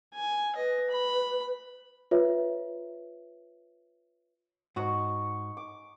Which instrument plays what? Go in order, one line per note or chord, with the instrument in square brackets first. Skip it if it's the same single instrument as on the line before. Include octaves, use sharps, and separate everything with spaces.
[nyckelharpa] G#5
[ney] B4 [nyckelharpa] D#5
[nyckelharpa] B5
[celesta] F4 B4 C#5 E5
[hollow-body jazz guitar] G#2 F#4 [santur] D#4 C#6
[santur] D6